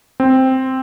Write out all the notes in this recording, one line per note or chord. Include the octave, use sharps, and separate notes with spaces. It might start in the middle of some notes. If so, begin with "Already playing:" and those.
C4